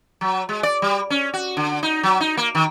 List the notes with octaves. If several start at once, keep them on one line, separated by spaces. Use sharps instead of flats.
F#3
G#3
D5
G3
C#4
F#4
D3
D#4
F#3
D#4
A#3
D#3